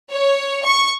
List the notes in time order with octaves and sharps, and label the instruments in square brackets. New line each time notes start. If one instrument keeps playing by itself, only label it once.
[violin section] C#5
C#6